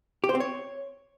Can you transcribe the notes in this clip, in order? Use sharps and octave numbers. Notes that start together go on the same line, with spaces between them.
G4
C5
C4
C#5